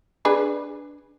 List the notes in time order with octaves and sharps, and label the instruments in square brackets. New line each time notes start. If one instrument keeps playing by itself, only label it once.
[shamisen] D4 G#4 B4